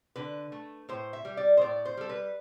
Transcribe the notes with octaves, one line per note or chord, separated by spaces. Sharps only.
D3 B4
A3
A2 C5
E5
G3
D5
C5
A2 D5
C5
G3 A4
B4